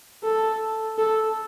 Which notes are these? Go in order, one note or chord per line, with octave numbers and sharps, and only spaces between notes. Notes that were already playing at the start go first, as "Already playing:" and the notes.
A4
A4